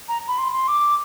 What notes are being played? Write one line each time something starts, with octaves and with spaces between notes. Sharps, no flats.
A#5
B5
C6
C6
D6